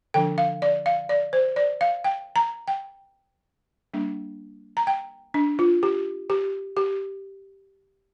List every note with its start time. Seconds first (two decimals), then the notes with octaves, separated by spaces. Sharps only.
0.14 D3 F3 D4 G5
0.38 F5
0.62 D5
0.86 F5
1.09 D5
1.33 C5
1.56 D5
1.81 F5
2.04 G5
2.36 A#5
2.68 G5
3.93 G3 A#3 D4
4.77 A#5
4.87 G5
5.34 D4
5.59 F4
5.83 G4
6.30 G4
6.77 G4